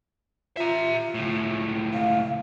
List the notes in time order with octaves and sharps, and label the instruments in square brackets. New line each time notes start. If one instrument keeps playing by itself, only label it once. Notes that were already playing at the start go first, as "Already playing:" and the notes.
[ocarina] F4 [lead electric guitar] E5 A#5
[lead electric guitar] C#2 A2
[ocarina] F5